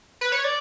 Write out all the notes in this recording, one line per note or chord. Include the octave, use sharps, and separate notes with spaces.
B4
C#5
D5